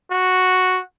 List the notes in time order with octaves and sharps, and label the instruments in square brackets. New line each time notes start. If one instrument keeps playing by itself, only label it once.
[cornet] F#4